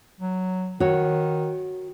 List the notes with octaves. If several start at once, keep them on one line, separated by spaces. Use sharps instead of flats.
F#3
D#3 F#4 C#5